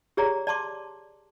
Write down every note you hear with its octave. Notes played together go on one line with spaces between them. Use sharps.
G4 G#4 C#5 D5 A#5
D5 A5 C6 D6